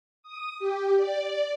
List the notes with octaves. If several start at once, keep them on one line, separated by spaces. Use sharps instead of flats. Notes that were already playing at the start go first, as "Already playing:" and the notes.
D#6
G4
D5